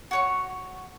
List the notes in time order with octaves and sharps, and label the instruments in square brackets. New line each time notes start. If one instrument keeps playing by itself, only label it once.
[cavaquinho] F#4 C#5 C#6